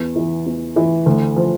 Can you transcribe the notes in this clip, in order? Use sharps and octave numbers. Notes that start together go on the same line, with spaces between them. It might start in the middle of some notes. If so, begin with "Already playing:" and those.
Already playing: E2
E3
E2
E3
D2
F3